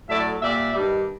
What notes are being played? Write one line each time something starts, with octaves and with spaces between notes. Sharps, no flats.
A2 F#3 A3 D5 E5
A#2 G3 D5 E5
G2 D#3 G3